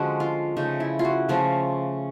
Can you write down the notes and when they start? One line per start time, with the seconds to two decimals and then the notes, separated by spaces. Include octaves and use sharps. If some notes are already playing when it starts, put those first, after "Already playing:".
Already playing: D3 F3 G#3 C#4 F#4 G#4
0.20 F4
0.57 C#3 F3 A3 D#4
0.80 E4
0.99 F4
1.05 F#4
1.29 C#3 F3 A3 F4